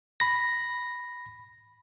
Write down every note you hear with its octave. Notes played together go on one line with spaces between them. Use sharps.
B5 A#6